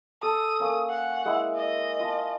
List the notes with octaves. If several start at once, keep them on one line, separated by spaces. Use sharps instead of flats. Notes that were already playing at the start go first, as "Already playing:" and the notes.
A4 D#6
A#3 C#4
F#5
G#3 E4 E6
D#5
F4 A5